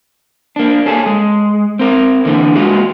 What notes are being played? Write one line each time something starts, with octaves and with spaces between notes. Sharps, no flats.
A#3 D4
C#4 G#4 A4
G#3
C4 A#4
D3 E3 A#3 B3
G#3 A#3 B3 F4 F#4 G#4